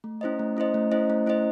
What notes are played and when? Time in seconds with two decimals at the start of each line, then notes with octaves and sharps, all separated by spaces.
0.04 A3
0.21 C#4 E4 C5 D#5
0.39 A3
0.57 C#4 E4 C5 D#5
0.74 A3
0.92 C#4 E4 C5 D#5
1.10 A3
1.26 C#4 E4 C5 D#5